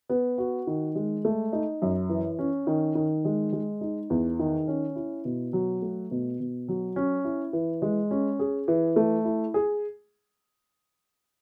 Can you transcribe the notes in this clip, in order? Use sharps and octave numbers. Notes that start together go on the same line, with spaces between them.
B3
F#4
D#3
G#3
A3
D#4
F#2
E3
C#4
D#3
D#3
G#3
G#3
D#4
E2
D#3
C#4
E4
B2
F#3
A3
B2
B2
F#3
C#4
E4
E3
G#3
C#4
G#4
E3
A3
E4
G#4